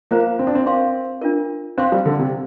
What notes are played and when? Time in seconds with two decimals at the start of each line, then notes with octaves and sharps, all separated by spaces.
0.11 A#3 F4 C5 F5 A#5
0.39 C4
0.47 D4
0.55 C4
0.66 C4 A#4 F5 C6
1.22 D4 F4 A#4
1.78 C4 C5 F5 C6
1.92 G3
2.06 D3
2.19 C3